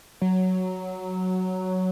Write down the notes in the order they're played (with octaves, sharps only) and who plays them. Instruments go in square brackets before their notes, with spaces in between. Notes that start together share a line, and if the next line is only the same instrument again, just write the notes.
[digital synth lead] F#3